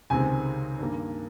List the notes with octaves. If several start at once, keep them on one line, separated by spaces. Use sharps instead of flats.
C#2 C3 D#3 G#3 C4 G#5
G2 D#3 A#3